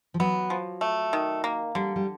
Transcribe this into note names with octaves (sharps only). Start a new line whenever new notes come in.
F3
F#3 B3
F3
A3
D#3
A#3
D3 G3
G3